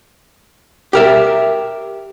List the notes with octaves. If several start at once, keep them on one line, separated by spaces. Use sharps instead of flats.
G4 A#4 E5